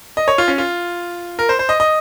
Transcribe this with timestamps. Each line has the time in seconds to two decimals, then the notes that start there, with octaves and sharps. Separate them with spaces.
0.17 D#5
0.28 C#5
0.38 F4
0.48 C#4
0.58 F4
1.39 A#4
1.49 C5
1.59 C5
1.69 D#5
1.80 D#5